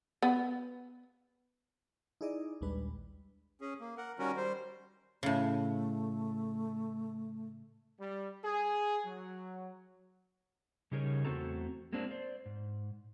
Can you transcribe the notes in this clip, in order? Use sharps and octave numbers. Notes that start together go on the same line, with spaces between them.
B3
D#4 E4 G#4 D5 D#5
A#1 D#2 G3 G#3 D4 B4
C#4 G#4
A#3
A#4 F#5
D#3 G3 C#4 F#4 A#4
G3 C5
A2 C#3 A3
G3
G#4
F#3
C#3 G3 D#4 G#4 A#4 C#5
E2 A3 C4 F#4 A4 A#5
G#3 A#3 C4 D4
C5 D5
G#2